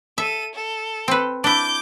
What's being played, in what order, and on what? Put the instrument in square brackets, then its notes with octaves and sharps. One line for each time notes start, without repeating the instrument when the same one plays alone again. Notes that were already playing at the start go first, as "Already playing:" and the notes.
[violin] A4 D#7 [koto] E5
[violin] A4
[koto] C4 B4
[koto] D4 E4 [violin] D6 G6